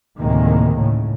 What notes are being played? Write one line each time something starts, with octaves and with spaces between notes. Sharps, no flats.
D2 A2 C3 D#3 G#3 A#3
A2 C#3